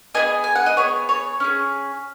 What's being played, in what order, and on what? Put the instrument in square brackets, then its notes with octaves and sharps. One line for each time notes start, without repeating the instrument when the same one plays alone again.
[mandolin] B3 G#4 D#5 G#5
G#5
F#5
D#5
B3 G#4 C#5
C#5
C#4 G#4